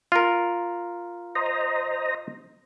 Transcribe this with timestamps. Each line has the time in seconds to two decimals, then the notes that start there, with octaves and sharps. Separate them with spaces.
0.12 F4 A#4
1.35 C5 D#5 A#5